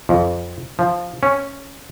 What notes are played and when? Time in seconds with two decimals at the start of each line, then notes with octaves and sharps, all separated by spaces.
0.09 F2
0.79 F3
1.23 C#4